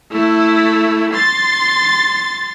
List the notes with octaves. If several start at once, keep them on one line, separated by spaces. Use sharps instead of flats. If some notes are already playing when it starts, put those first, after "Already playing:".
A3 E4
C6 A6